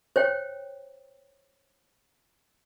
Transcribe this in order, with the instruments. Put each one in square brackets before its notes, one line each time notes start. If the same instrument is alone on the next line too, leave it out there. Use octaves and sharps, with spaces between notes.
[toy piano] C5 C#5 G5